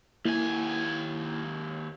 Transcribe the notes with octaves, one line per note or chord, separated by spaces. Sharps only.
D#2 A#3 E4 G#5